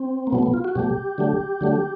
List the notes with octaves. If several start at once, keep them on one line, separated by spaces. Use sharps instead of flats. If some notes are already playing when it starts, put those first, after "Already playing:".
Already playing: C4
A#3
B2 F#3 A3 B3
B3
F4
F#4
B2 F#3 A3 G4
D3 F#3 A3
D3 F#3 A3